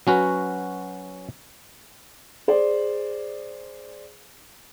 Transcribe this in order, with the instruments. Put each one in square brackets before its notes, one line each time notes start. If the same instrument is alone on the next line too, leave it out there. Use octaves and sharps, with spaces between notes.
[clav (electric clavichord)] F#3 C#4 F#4 B4
[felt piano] G#4 C5 D5